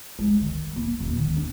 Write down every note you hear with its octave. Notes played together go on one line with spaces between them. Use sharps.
G#3
D#3
A#3
D#1
D#3
D4